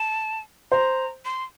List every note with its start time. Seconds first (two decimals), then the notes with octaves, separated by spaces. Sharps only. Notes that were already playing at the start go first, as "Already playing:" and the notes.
Already playing: A5
0.72 C5 A#5
1.25 C6